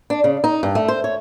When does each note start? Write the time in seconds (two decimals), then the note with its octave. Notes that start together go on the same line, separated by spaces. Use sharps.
0.10 D4
0.24 C#3
0.44 D#4
0.63 G2
0.75 A3
0.88 C5
1.04 C#5